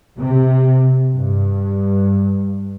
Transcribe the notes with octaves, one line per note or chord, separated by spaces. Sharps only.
C3
G2